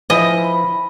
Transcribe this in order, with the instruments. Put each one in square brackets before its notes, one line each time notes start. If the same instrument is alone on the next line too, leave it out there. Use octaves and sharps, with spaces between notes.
[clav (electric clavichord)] F3 E4 [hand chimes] B4 G#5 [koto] D#5
[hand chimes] B5